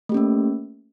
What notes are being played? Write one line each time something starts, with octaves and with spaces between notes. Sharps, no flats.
A3 A#3 C#4 G4